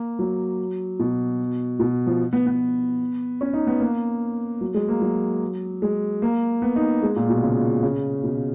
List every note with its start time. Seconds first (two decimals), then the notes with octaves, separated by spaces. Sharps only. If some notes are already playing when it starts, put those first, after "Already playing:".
Already playing: A#3
0.19 F#3
0.99 B2
1.80 B2
2.07 F3
2.33 B3
2.46 B3
3.41 C#4
3.53 D#4
3.67 B3
3.80 A#3
4.61 F#3
4.74 G#3
4.88 A#3
5.02 F#3
5.82 G#3
6.22 A#3
6.62 B3
6.76 D#4
7.02 G#3
7.16 A#2
7.30 B2
7.43 C#3
7.83 C#3
8.23 B2